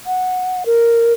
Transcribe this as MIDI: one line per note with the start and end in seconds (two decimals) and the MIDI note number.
0.06 0.64 78
0.66 1.13 70